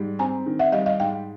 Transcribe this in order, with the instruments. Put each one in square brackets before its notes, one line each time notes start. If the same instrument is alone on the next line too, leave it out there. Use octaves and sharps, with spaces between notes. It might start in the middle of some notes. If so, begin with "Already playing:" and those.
Already playing: [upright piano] G#2 G3
[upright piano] C4 [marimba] G#5 A#5
[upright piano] D#3
[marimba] E5 F#5
[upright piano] G3 [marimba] D#5 F5
[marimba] D#5 F5
[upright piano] G#2 [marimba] F5 G5